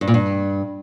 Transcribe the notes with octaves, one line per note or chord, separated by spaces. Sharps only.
G2
A#2
G2